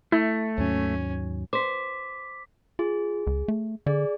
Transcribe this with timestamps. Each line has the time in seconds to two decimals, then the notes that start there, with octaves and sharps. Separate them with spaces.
0.12 A3 E4
0.58 D#2 G#2 F#3 C#4
1.53 C5 D6 B6
2.79 F4 G#4
3.27 C#2
3.48 A3
3.86 D3 G#4 D5